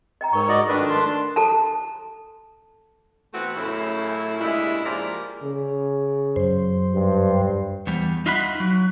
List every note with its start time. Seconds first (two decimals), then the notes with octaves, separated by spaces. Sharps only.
0.21 D#5 G5 A#5
0.33 G#2 A#4 C#5 C#6
0.49 F#4 D5 D#5
0.68 D#3 F3 A3 D4 B4
0.90 A5 C6
1.36 A4 A5 A#5
3.34 E3 A3 B3 C4 F#4
3.57 F#2 A2 C#3 C#4 E4
4.40 G2 A#2 C#3 G3 G#3 E4
4.86 F3 G#3 A#3 G4 A#4 D5
5.43 C#3
6.36 F#2 C5
6.94 G2
7.87 E2 G3
8.26 D#4 F4 E5 F#5 B5
8.60 F#3